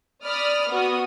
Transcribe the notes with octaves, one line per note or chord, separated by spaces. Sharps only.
D5 B5 D#6 F6
B3 F#4 D#6